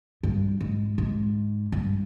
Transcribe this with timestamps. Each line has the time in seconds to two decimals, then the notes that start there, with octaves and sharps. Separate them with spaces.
0.23 G2
0.61 G#2
0.98 G#2
1.72 G2